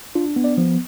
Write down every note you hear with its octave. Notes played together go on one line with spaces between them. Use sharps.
D4 F4
B3
D5
F3